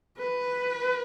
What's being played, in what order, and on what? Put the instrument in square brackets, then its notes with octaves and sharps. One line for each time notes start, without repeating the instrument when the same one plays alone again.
[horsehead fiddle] B4